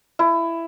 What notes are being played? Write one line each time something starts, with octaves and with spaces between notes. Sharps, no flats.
E4